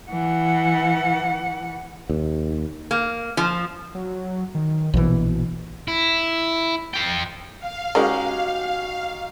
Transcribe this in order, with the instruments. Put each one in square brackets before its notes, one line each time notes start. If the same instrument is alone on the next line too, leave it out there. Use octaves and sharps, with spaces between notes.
[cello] E3 F#5
[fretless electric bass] D#2
[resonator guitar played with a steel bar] A#3
F3
[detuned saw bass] F#3
D#3
[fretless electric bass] A#1 E3 [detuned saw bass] B2
[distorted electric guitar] E4
F4 G5
[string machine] F5
[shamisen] C#3 A#4 [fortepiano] G#3 C#4 [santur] D#4 F#4 G4